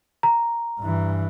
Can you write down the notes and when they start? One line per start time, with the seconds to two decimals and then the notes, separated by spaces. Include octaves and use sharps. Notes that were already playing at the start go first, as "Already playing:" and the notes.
0.23 A#5
0.80 G2 E3